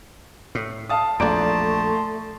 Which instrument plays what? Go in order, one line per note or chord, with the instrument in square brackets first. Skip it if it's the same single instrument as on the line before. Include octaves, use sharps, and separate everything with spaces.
[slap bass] A2
[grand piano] F5 A5 D#6
[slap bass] A#1 E2 [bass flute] A3 [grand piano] D5 A#5 D7 [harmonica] A5 C6